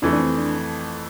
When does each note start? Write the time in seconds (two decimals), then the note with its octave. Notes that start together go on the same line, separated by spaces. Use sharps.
0.02 F2 E3 A3 D4
0.13 D4
0.20 C4
0.38 D4